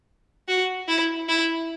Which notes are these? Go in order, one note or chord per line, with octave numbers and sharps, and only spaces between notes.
F#4
E4
E4